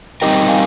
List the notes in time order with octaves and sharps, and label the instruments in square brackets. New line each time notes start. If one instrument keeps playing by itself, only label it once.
[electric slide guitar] G3 C4 D#4 G4 A#4 [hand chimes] D#5 G5
[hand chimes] F5 G#5